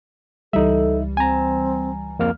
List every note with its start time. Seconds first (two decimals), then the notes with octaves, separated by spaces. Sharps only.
0.53 C#2 E3 G3 D#4 A4 E5
1.17 C4 G#5 A#5
2.19 F2 A#3 F6